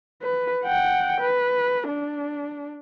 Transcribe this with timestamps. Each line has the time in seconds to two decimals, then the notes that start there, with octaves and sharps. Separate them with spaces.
0.22 B4
0.64 F#5 G5
1.20 B4
1.88 D4